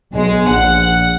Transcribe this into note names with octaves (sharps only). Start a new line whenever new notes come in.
B1 G#3
A#1 F#5